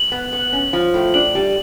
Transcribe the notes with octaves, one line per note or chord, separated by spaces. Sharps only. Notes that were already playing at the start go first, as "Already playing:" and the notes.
Already playing: F#7
B3
B3
C#4
F3
A2
D4 F#7
G3